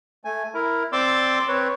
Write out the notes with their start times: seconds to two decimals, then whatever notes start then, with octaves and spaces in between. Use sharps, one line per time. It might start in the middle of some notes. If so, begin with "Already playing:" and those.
0.25 A3 G#5
0.54 E4 A#4
0.92 C4 D5 C6 D6 E6
1.48 C4 B4 C#5